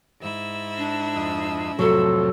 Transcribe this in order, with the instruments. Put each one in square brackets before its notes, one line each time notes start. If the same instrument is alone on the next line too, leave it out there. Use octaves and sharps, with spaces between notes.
[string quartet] G#2 E4 E6
[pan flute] D4
[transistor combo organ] F2 D#5
[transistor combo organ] F2 A2 C3 [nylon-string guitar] F#3 [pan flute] A4